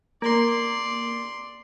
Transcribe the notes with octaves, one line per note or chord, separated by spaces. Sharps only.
A#3 D5 C6